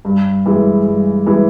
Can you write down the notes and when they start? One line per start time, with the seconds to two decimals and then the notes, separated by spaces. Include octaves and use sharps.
0.05 G2
0.46 E3 G#3
0.86 G2
1.26 E3 G#3